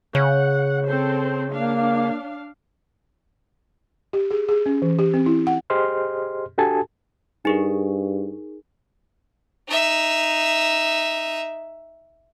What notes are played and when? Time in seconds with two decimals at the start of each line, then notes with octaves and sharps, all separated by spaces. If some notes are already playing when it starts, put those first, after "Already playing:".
0.15 C#3 C#5 F#5
0.87 C4 A4 C5
1.53 A#3 D4 F5
4.13 G4
4.31 G#4
4.49 G#4
4.66 C#4
4.82 E3
4.99 G4
5.14 C4
5.26 E4
5.47 F#5
5.70 G4 G#4 C5 D#5 C6 F6
6.58 D4 F#4 G4 A4 G#5 A5
7.45 G2 D#4 G#4 A#4
9.68 D#4 E5